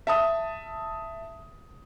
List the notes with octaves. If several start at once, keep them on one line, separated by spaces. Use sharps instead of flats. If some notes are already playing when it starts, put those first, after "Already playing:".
E5 A5 D#6